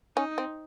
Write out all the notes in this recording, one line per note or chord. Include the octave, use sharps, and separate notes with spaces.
C#4 D#4
C4